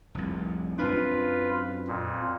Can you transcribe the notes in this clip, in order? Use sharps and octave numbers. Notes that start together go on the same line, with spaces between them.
F1 C2
F#2 C4 D4 F4 B4
F2 A#2